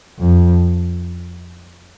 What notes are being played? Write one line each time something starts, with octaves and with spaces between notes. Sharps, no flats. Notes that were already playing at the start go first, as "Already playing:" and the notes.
F2